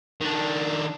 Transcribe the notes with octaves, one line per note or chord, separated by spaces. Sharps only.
D#3 D4